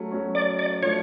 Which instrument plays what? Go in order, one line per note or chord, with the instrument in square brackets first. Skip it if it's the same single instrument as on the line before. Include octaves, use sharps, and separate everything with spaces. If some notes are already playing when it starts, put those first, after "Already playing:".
Already playing: [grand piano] F#3 A3 C#4
F#3 A3 C#4
[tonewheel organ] D5
D5
[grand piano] F3 A3 D4 [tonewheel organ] C#5